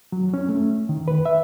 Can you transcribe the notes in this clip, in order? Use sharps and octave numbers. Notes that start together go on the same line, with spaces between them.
F#3
C#4
A3
D#3
B4
E5